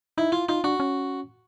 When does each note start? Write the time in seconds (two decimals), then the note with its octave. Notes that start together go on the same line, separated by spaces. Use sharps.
0.18 D#4 E4
0.32 E4 F4
0.49 D#4 F4
0.64 D4 F#4
0.80 C#4